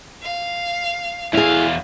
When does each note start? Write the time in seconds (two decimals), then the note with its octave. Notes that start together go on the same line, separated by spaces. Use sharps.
0.22 F5
1.33 E2 E4 G#4 F5